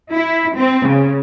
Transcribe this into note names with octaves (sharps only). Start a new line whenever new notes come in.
E4
C4
C#3